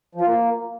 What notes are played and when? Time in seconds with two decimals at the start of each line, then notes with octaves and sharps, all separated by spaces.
0.15 F3
0.21 F4
0.27 A#3